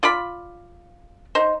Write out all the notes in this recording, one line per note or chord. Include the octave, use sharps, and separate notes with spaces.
F4 D5 F5 B5
D#4 C5